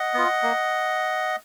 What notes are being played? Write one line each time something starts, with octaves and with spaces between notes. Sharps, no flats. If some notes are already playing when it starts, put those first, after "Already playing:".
Already playing: D#5 F#5
B3 F4
A#3